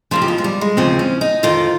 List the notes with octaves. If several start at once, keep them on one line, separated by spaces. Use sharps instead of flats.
D#2 C#3 F3 F4
G4
F4
G#3
G3
G#3
D#2 C#3 F3 C4
C#4
D#4
F2 D#3 F4